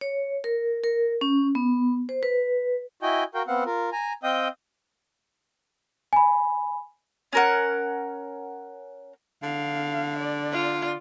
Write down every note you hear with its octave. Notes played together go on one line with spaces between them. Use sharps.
C#5
A#4
A#4
C#4
B3
C5
B4
E4 F#4 D#5 G5 G#5
F#4 A#4 F5 G5
B3 C4 F5 F#5
F4 A#4
G#5 A#5
C4 D#5 F5 G5 D#6
G#5 B5
C#4 A#4 F#5
D3 F5
D5
F4